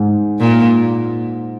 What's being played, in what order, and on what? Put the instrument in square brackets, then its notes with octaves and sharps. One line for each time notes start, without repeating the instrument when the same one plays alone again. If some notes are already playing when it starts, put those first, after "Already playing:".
Already playing: [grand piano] G#2
[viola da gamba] A#2